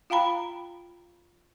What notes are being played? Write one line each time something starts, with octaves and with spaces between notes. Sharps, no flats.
F4 F5 G5 A#5 B5